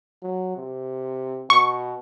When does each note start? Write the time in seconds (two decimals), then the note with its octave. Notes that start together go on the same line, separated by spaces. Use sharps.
0.22 F#3
0.56 C3
1.50 B2 C#6